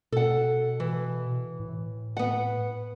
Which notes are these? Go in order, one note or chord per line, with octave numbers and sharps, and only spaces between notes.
B2 A4 F#5
E3
A2
B3 F#5